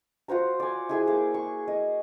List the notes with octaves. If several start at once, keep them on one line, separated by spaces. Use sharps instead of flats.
F4 F#4 C5 A#5
D5 G#5
E4 G#4 G#5
A#3 D6
C#6
D#5